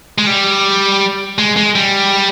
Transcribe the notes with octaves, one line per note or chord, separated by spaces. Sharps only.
G#3
G3
G#3
G#3
G3